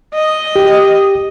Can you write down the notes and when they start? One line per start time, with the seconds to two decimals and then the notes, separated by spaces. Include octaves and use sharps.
0.14 D#5
0.56 G4